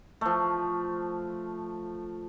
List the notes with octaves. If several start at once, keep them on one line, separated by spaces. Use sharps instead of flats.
F3 A3